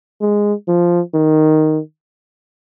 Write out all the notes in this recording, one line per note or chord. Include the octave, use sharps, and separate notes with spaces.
G#3
F3
D#3